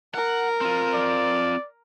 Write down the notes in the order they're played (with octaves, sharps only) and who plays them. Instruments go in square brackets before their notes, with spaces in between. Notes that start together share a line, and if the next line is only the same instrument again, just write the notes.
[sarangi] A#4 [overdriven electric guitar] F#5
[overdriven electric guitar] C4 F4
[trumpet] D5